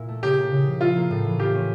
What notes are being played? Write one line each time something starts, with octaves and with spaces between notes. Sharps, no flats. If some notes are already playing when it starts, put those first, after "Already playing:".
Already playing: A#2 E4
A3
C#3 G4
A#3
C#3
F3
E4 F4
A#3
A2
E3
F4 G4
C#4